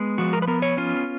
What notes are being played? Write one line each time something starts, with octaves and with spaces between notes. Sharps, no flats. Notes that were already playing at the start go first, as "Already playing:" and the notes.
Already playing: G#3 B3
F3 F#4
A#4
B4
B3 A#4
C#5
C#4 F4